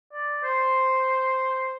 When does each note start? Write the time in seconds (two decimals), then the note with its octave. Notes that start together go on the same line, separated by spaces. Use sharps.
0.13 D5
0.43 C5